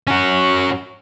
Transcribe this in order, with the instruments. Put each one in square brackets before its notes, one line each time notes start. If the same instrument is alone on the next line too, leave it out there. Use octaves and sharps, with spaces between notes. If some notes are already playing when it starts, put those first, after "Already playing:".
[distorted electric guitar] C#4 F#4